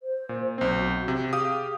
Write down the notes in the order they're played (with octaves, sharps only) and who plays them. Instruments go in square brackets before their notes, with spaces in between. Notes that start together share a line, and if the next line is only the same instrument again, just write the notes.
[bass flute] C5
[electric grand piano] A#2
[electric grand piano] B1 C4 [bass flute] C5
[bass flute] F#4
[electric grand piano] C3
[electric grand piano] G4 F5 D#6 [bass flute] G#4